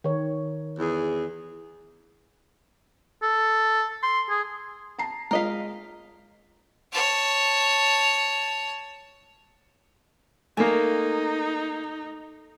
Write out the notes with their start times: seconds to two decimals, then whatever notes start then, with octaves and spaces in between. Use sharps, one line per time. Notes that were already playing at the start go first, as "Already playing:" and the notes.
0.04 D#3 C#5
0.79 E2 G#4
3.23 A4
4.03 C6
4.30 G#4
4.99 A5 A#5 C7
5.31 G#3 F4 A#4 D#5 F5 B6
6.92 C#5 A5
10.57 A3 A#3 D#4 G#5